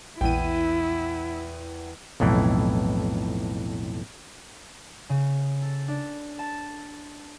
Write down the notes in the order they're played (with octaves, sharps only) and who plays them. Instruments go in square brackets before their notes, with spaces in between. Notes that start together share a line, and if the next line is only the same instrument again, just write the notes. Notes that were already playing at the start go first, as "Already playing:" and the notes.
[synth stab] A#1 D#7 [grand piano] E2 G5 [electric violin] E4
[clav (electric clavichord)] B1 F2 A2 E3
[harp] C#3
A4
D4
A5